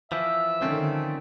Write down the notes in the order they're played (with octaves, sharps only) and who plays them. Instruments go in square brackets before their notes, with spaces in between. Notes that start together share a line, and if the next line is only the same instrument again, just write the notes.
[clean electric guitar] E3 F3 [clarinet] E5
[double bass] D3 D#3 [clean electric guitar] F3 A3 C4 [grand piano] C#4